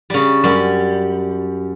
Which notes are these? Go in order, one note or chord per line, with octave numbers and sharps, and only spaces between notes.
C#3 G3
F#2 G3